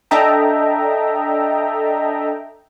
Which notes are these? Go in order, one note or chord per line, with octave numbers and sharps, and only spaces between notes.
D4 A4 D#5 E5 G5 A#5